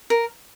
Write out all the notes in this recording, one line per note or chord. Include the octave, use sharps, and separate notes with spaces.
A#4